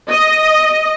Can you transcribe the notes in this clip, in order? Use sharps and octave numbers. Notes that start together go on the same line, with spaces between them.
D#5